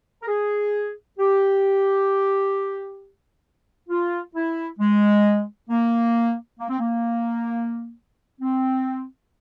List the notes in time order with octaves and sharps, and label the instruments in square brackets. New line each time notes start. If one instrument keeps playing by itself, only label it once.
[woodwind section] A#4
G#4
G4
F4
E4
G#3
A#3
A#3
C4
A#3
C4